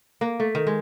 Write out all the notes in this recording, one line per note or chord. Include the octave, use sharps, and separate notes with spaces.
A#3
A3
D#3
G#3